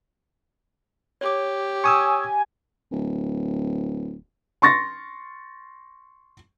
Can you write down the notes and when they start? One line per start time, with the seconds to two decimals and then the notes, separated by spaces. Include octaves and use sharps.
1.21 G4 C#5 D6
1.84 G#5 C#6 D#6 E6
2.91 D1
4.62 C6 C#6 A6 A#6